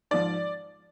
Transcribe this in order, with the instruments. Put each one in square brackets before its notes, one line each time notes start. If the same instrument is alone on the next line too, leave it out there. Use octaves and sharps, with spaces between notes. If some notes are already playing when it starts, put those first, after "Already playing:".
[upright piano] G#2 F3 D5